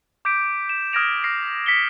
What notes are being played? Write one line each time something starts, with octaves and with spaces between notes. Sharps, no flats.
D6 G6 B6 D7
E7
D#6 F6 G#6 A#6 D7 F7
C#6 F6 A#6 C7
B6 C#7 G7